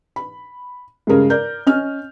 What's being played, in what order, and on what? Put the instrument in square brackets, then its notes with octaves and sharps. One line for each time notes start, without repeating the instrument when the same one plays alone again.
[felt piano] B5
[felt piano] G2 A#4 [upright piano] C#3 G#3
[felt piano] A#4 D5 [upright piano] G6
[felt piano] C#4 D#5 F6